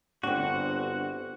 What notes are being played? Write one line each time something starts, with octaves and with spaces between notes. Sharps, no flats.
G1 C4 D4 F#4 F#5